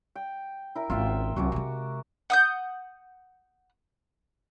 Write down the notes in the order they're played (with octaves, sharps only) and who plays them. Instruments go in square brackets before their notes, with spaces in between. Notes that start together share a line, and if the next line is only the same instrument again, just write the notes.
[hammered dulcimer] G5
E4 A#4 E5
[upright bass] G#1 C#4 [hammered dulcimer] F4 E5 G5
[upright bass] C2 F#3 [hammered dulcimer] F#4 G#5 D6
[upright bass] C3 G#3
[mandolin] F#5 D#6 G6